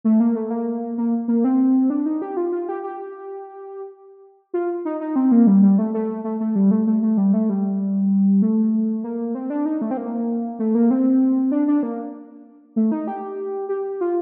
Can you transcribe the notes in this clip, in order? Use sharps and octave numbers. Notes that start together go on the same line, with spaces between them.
A3
A#3
A3
A#3
A#3
A#3
C4
D4
D#4
G4
F4
F4
G4
G4
F4
D#4
D#4
C4
A#3
G3
G3
A3
A3
A3
A3
G3
A3
A3
A3
G3
A3
G3
A3
A#3
C4
D4
D#4
A3
C4
A#3
A3
A#3
C4
D4
D4
A#3
A3
D#4
G4
G4
F4